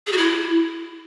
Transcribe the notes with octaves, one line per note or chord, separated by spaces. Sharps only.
G#4
F#4
E4